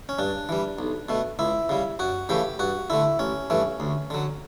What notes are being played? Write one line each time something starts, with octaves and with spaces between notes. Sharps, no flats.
C#4
G2 D4
E3 G3
B1
B2 A3
C#2 E4
C#3 G3
F#2 F#4
C#3 E3 A3 G4
G2 F#4
D3 A3 E4
A1 C#4
G2 E3 A3
D2
D3 F#3